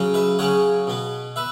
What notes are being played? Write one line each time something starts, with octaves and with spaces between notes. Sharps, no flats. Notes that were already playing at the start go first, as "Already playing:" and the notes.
Already playing: C#3 F#3 C#4
B4 E5
C#3 F#3 C#4 C#5 F#5
B2 B3
B4 E5